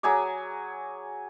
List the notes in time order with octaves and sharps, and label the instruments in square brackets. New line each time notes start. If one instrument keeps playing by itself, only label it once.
[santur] F#3 G#4 G#5 D6